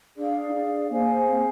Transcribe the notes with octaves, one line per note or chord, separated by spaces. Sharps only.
D4 G#4 D5 F5
D#4
D4
A#3 G#4 C5 F5 G#5
C4